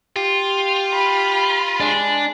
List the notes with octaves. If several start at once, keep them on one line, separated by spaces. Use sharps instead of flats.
F4 G4
B5
G#3 D4